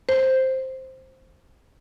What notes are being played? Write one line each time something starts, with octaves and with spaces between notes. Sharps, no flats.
C5